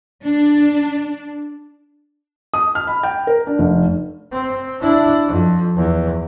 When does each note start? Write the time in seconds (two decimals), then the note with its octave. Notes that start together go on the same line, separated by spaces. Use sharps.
0.23 D4
2.54 D#6
2.75 F6
2.87 B5
3.03 G5
3.27 A#4
3.47 D4
3.59 F1
4.32 C4
4.82 D4 E4
5.28 F2
5.76 E2